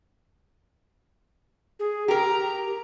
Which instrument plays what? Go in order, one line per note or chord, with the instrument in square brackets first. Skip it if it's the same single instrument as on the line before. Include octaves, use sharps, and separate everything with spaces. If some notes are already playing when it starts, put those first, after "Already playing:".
[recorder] G#4
[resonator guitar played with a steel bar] G4 A#4 [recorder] A#5